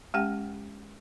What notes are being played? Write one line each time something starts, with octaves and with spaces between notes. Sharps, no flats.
G#3 C#4 G4 F#5 G5